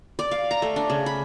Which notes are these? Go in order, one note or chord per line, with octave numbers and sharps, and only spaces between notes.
D5
F5
A#5
A3
D4
C#3
B5